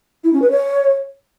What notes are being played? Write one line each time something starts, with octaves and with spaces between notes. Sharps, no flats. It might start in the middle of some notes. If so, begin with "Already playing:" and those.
E4
C#4
B4
C#5